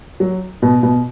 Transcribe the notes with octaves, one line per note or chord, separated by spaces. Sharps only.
F#3
B2
B2